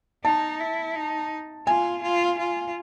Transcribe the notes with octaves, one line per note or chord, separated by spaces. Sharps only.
D#4 A5
E4
D#4
F4 G#5
F4
F4